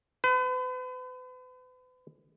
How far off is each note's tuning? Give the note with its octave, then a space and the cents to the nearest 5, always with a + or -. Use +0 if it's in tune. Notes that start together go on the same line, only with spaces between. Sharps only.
B4 +40